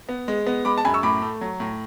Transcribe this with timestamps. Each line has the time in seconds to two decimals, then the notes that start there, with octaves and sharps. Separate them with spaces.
0.09 B3
0.28 G#3
0.46 B3
0.65 G#3 B5 D6
0.78 A5
0.85 F#2 G#5 B5
0.94 C#6 E6
1.03 A2 B5 D6
1.22 A3
1.41 F#3
1.60 A2